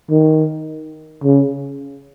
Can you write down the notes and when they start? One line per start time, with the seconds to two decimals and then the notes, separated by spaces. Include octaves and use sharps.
0.10 D#3
1.24 C#3